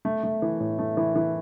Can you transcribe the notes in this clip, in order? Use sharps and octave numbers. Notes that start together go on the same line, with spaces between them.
A3
A3
E3
A2
A3
E3
E3